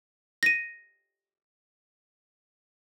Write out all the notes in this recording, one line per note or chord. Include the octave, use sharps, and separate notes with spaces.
A#6 D#7